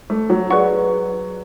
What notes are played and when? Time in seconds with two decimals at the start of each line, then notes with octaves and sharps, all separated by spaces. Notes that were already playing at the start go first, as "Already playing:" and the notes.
0.10 A3
0.30 F#3
0.50 F#3 G#4 B4 D5 F#5 C#6